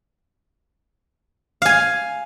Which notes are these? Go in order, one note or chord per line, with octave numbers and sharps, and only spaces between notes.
F5 G#5